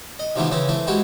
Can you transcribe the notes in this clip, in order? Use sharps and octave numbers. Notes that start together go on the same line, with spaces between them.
D#5
D#2 C3 E3 F3 A3 B3
C#3 E3 C4 E4
E3 A3 C4
G#3 C4 E4 F#4 G4